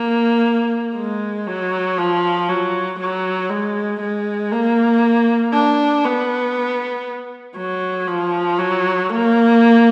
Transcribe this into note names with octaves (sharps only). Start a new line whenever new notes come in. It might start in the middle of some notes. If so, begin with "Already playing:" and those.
Already playing: A#3
G#3
F#3
F3
F#3
F#3
G#3
G#3
A#3
D4
B3
F#3
F3
F#3
A#3